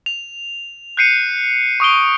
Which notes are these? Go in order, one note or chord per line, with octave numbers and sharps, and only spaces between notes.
F7
F#6 G6 C7 C#7 D#7
C#6 D#6 D7 G7